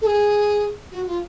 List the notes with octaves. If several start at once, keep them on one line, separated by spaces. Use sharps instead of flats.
A4
G#4
F#4
F4